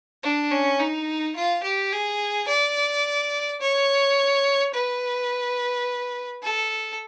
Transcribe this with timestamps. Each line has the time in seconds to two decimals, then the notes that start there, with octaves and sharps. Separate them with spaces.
0.23 D4
0.51 C#4
0.79 D#4
1.35 F4
1.63 G4
1.92 G#4
2.48 D5
3.61 C#5
4.74 B4
6.43 A4